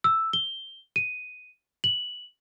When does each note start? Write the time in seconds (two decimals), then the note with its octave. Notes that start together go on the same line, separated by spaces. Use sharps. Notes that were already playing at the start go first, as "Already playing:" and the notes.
0.04 E6
0.33 G7
0.96 D#7
1.84 F#7